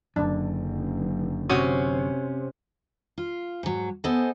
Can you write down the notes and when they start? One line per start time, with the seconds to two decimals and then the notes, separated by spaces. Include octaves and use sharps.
0.16 F#1 F#2 D3 D4
1.50 C3 C#4 F#4 D#6
3.18 F4
3.63 G#2 F#3
4.04 B3 A4 C5 D#5 G#5